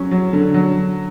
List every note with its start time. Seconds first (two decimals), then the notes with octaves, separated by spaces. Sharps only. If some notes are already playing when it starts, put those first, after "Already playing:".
Already playing: F#3 C#4
0.11 F#3
0.33 D3
0.54 F#3